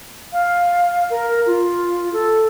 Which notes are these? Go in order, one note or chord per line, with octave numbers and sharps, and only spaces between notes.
F5
A#4
F4
A4